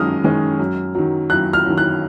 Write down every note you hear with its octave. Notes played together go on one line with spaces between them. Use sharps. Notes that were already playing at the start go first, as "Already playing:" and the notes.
Already playing: F#2 D#3 G#3 C#4 D#6 F6
D#3 G#3 C#4
F#2
D#3 F#3
F#2 F#6
F6
D#3 F#3
F#6